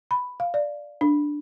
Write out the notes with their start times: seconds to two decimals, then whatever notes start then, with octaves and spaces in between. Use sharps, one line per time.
0.11 B5
0.40 F5
0.54 D5
1.01 D4